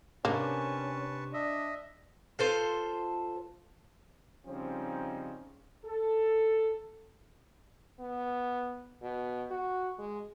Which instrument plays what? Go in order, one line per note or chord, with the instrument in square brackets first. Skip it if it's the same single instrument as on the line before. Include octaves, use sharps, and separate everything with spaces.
[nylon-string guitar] C3 D4 [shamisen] A#3 [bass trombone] C#4 [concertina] B4 A5 C#6
[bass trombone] D4 [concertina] D#5 E5
[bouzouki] F4 A4 C5
[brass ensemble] C#3 F3 G3 C4 C#4 D#4
A4
[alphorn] B3
B2
F#4
G#3